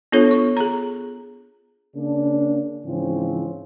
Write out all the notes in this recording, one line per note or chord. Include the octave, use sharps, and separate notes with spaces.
B3 D4 F4 A4 C#5
C#6
G#4 A#5
C#3 A#3 C#4 D4
G#2 C#3 E3 F3 C4 C#4